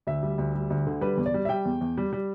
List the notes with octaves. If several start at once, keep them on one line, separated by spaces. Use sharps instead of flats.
D2 E5
G3
D2
G3
D2
D3
G3 B4
E2
D5
G3
E5
G3 G5
E2
E2
G3
G3